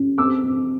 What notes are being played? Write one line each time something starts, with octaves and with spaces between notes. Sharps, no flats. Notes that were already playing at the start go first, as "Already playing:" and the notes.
Already playing: C#4
C4 D6 E6
C4